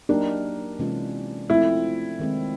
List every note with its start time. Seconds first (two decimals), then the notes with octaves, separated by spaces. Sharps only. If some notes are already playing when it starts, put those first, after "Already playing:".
0.09 F#3 A#3 D4 D#4 G4 A#4
0.79 C3 E3 G#3 C#4 F4
1.49 F3 A3 C4 E4 F4
2.20 D#3 G#3 C4